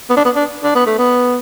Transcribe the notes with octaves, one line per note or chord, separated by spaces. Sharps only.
B3
D4
B3
D4
D4
B3
A3
B3